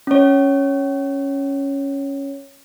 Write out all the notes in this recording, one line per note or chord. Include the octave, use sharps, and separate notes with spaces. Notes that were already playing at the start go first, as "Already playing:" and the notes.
C#4 C#5